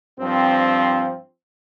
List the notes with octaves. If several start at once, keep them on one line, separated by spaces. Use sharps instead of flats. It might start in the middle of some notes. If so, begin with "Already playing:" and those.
G2 F3 C4